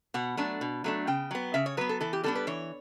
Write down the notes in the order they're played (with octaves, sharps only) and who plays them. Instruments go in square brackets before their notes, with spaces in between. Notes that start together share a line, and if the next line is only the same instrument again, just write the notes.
[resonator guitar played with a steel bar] B2 F#5
F#3 A3 D4
B2
F#3 A3 D4
C#3 G5
F#3 B3
C#3 E5
C#5
F#3 B3 B4
A4
E3 A4
G4
G3 B3 D4 A4
B4
E3 C#5